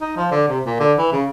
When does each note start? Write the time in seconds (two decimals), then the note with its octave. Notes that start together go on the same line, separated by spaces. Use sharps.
0.01 D#4
0.17 F3
0.31 D3
0.49 C3
0.65 A#2
0.80 D3
0.98 E3
1.12 C#3